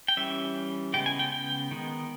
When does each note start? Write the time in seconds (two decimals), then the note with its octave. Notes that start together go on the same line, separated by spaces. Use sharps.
0.08 G5
0.17 E3 G3 C#4 E5
0.94 C#3 G#3 B3 G5
1.06 G#5
1.19 G5
1.32 G5
1.71 D#3 G#3 B3